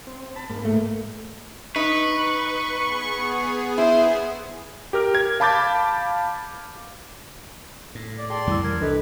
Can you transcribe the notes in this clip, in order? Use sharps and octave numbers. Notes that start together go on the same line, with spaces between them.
C4
A5 B5
G#2 A#3
A3
D#4 B4 C#6
B3 G#4
E4 C5
G4 A#4 F6
G#6
F5 A5 B5 D6 G6 A6
A2
D5
G#4 D5 G5 A5 C6
F2 E3 G3 E4 E6
A#4 G#6
C2 D4 A4 B4 D#5